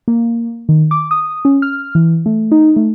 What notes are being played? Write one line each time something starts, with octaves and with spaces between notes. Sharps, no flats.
A#3
D#3
D6
D#6
C#4
F6
E3
A3
D#4
A3